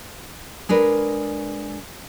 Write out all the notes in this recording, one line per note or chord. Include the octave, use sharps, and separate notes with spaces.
G#3 D4 A#4 B4